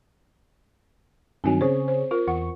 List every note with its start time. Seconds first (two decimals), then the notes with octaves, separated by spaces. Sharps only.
1.44 G2 D#3 F#3 C4 G#5
1.61 C#3 G#4 C5 C#5
1.88 C5
2.11 F4 A#4
2.28 E2 F#5 C#6